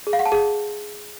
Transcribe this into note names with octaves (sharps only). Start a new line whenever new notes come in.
G#4
F5
F#5
A5
G#4